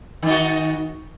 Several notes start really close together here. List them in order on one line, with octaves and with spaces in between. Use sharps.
D#3 D#4 F#4